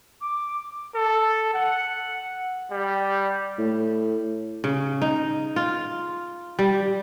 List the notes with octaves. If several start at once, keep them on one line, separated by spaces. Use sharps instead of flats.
D6
A4
F#5
G3
A2
C#3
D#4
F4
G3